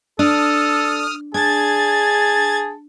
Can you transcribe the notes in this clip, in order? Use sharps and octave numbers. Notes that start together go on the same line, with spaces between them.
D4 A4 D#6 F6
D4 G#4 A5 G#6 A6